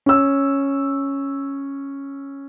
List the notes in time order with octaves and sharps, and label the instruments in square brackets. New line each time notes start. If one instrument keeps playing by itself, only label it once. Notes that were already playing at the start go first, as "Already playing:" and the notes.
[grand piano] C#4 E6